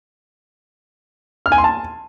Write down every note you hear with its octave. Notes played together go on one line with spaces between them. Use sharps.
F6
G#5
C6
A5